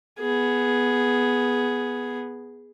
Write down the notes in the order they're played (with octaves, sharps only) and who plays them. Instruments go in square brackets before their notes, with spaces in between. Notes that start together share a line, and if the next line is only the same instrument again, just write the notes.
[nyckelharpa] B3 G#4